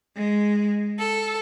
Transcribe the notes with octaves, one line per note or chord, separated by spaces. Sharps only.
G#3
A4